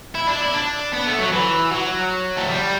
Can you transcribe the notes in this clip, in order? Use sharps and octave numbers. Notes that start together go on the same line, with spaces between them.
E4
D4
E4
D4
B3
A3
F#3
E3
F#3
A3
G3